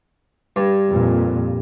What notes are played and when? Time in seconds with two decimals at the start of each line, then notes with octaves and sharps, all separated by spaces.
0.56 G2
0.91 F2 A#2